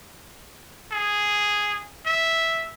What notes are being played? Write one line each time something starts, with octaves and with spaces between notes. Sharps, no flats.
G#4
E5